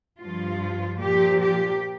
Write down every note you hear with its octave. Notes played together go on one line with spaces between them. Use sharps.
G2 F3 F4
A#2 F3 G4
G4